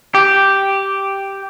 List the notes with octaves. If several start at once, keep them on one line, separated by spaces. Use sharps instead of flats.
G4